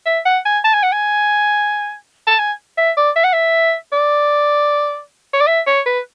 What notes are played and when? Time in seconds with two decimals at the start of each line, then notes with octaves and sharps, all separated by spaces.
0.06 E5
0.25 F#5
0.46 G#5
0.64 A5
0.74 G#5
0.83 F#5
0.92 G#5
2.27 A5
2.38 G#5
2.77 E5
2.97 D5
3.16 E5
3.24 F#5
3.33 E5
3.92 D5
5.33 C#5
5.41 D5
5.47 E5
5.67 C#5
5.86 B4